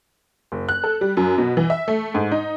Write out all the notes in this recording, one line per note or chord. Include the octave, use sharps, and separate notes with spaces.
F#1
F#6
A4
G3
F#2
B2
E3
E5
A3
G#2
D#4